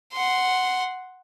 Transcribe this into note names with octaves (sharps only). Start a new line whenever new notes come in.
F#5 C6